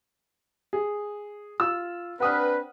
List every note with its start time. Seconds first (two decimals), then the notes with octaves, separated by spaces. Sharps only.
0.73 G#4
1.60 F4 E6
2.20 C4 D4 B4 F#5 D#6 F6